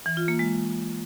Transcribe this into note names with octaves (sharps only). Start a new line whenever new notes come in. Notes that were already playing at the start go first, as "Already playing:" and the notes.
E3
F4
A#3
G#3